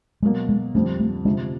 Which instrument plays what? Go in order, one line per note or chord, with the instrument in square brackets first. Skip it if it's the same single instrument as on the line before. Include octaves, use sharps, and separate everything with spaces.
[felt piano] B2 F#3 A#3 [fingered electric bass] G#3
[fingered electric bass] G#3
[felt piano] F2 D3 G3 C4 [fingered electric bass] A3
[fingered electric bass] A3
[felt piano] D2 C3 F3 [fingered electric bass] G#3